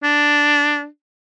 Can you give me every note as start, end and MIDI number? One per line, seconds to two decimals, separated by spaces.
0.03 0.86 62